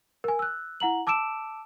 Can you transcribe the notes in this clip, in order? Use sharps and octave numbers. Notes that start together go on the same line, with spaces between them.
A#4 G#5
E6 F#6
E4 F#5 A#5 F#7
A5 D6 E6 D7 E7